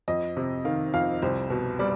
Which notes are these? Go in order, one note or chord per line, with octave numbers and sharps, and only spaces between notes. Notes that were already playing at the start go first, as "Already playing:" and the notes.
F2 D#5
C3
D#3 F5
F2 F5
C2 C5
B2
G3 D5